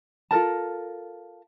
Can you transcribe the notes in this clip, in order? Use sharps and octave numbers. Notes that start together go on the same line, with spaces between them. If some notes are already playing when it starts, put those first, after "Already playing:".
F4 A4 A#4 A5